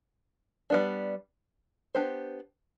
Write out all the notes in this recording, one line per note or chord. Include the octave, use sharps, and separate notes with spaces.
G3 B3 D4
B3 D4 G4 C5